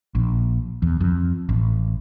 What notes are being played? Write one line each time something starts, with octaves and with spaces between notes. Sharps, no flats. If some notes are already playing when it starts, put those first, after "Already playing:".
A#1
E2
F2
A1